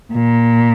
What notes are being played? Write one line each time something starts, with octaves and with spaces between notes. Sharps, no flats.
A#2